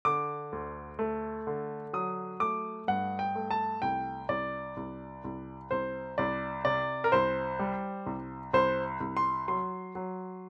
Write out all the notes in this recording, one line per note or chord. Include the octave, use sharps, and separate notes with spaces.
D3 D6
D2
A3
D3
F#3 D#6
A3 D6
G2 F#5
G5
A3
A5
C2 G5
C2 D5
C2
C2
C2 C5
C2 D5
C3 D5
A#4
C2 C5
G3
C2
C2 C5
C2
C6
F#3 C6
F#3